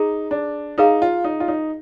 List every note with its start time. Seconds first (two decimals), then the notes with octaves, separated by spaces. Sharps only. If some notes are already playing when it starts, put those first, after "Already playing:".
Already playing: D#4 G#4 A#5
0.31 D4
0.78 D#4 G#4 B4 F5 A#5
1.02 F4
1.24 D#4
1.40 F4
1.48 D#4